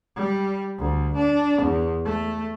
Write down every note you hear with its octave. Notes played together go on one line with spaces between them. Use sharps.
G3
D2
D4
E2
A3